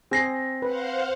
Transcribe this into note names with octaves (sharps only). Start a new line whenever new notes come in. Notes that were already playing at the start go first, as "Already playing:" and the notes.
C4 G#4 A#6 C7
B4 C5 F5 F#5